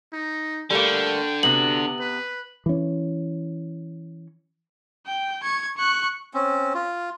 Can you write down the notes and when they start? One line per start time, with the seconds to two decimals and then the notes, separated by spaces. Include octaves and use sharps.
0.13 D#4
0.71 D3 G3 A3 A#3 G5
1.43 C3 B3 F#4 F#7
2.00 B4
2.66 E3 C#4
5.06 G5
5.43 C#6 G#6
5.77 C#6 F#6
6.34 C4 C#4
6.75 F4